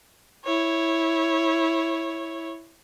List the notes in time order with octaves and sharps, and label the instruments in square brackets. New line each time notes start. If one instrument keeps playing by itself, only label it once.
[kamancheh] E4 C#5